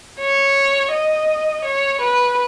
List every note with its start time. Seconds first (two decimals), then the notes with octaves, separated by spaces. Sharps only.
0.20 C#5
0.92 D#5
1.64 C#5
2.00 B4